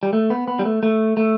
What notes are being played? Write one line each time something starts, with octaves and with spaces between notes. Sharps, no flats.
G3
A3
B3
B3
G3
A3
A3
A3